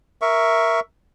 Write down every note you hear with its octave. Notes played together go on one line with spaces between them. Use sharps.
A#4 E5 C#6